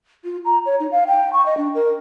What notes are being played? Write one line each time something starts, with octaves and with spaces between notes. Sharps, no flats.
F4
A#5
C#5
D#4
F5
G5
C#6
D#5
D4
A#4